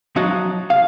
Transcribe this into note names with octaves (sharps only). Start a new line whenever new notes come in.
F3 F#3 D#4 F#4
F5